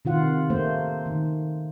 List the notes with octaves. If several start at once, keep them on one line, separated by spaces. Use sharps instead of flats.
C3 D#3 F4 F#5
A3 A#3 C5
D#3